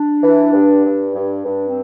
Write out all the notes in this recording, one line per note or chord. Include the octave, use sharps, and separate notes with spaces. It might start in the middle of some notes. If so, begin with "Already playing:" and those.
Already playing: D4
E3
G2
G2
G2
G2 D4
C4